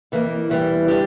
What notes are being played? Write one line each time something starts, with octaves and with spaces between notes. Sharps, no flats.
F2 E3 A#3
E2 E3 G3
G3 D4 G4